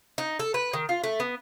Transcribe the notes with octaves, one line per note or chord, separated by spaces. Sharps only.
D#4
A4
B4
D#3
F4
A3
B3